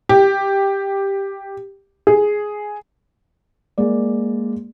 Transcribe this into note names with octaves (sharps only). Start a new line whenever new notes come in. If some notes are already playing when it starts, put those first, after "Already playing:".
G4
G#4
G#3 A#3 D5